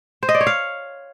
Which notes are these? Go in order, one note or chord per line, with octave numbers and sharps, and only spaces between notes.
C5
D#5
D5
C#5
F5